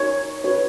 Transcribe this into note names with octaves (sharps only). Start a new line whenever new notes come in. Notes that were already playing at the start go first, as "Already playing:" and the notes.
Already playing: D#4 F#4 A#4 C#5
F#4 B4 C#5